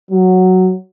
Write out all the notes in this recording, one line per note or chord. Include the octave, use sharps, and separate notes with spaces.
F#3